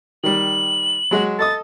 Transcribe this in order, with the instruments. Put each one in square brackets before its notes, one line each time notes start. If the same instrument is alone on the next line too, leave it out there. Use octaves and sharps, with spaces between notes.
[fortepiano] D#3 G3 [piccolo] F#7
[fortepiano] F#3 G#3 F#4
[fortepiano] A4 D#5 D#6 [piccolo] A6